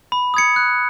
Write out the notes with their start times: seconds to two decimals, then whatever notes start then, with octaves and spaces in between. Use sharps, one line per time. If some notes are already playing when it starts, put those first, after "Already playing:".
0.12 B5
0.34 D#6 G#6 C#7
0.56 F#6